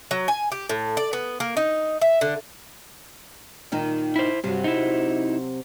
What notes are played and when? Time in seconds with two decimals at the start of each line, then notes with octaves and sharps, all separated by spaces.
0.11 F#3
0.28 G#5
0.52 G4
0.69 A2
0.97 D5
1.13 B3
1.40 A#3
1.57 D#4
2.02 E5
2.21 D3
3.72 A#2 D#3 D#4
4.16 E4 C5
4.44 G2 C3 F#3
4.64 D#4 E4